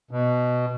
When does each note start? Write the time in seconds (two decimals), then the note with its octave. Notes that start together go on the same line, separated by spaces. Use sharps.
0.11 B2